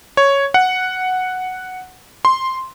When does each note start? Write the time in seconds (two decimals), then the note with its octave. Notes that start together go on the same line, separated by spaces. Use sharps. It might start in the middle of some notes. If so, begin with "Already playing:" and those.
0.17 C#5
0.54 F#5
2.25 C6